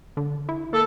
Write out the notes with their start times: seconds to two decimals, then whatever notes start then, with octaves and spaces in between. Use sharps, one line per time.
0.17 D3
0.49 E4
0.73 A#3 A4